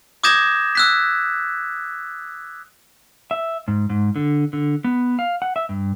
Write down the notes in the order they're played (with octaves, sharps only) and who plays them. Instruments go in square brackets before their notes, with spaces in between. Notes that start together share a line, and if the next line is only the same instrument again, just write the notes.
[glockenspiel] D6 D#6 G6 G#6 A#6 E7
E6 F#6 B6
[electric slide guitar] E5
G#2
G#2
D3
D3
B3
F5
F#5
E5
G2